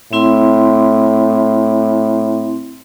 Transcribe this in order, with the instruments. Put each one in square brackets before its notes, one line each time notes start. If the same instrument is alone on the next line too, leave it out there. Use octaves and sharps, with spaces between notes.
[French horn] A2 [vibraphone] C4 E4 C6